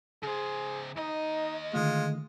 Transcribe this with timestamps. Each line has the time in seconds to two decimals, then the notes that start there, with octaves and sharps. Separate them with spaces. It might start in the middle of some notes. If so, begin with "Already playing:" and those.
0.23 C#3 G#4 C5
0.97 D#2 D#4 D#5
1.74 D3 D#3 G#3 A3 F4